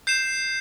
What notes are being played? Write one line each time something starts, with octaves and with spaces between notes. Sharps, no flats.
G6 C7 E7